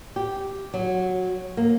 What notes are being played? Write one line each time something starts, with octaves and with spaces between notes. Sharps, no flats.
G4
F#3
A#3